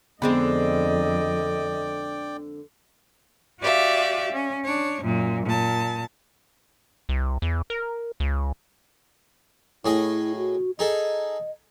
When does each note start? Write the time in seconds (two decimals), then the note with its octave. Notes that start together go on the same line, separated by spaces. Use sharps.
0.22 F2 D3 G#3 B3 C4 D5 D#5 G5
3.61 F#4 G4 D5 E5 F5
4.32 C#4
4.64 D4 C#5
5.01 F#2 A#2
5.44 A#2 A5
7.09 C2
7.42 E2
7.70 A#4
8.20 C#2
9.85 A2 E4 G#4 D#5
10.37 F#4
10.79 D#4 G#4 A4 D#5